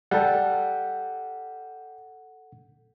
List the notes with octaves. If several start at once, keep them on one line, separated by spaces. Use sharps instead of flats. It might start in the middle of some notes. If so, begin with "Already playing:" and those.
G3 A4 F#5